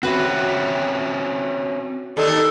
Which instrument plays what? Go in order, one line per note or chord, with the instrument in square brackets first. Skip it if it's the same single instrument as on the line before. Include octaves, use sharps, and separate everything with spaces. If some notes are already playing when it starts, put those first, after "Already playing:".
[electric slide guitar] C4 C#4 E5 [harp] F#4 B4
[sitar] D#2 D4 D#4 [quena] A4